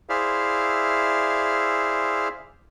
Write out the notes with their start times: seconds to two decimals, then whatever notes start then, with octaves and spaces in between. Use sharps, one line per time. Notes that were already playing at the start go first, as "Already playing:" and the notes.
0.09 E4 G#4 C5 D5 E5 F5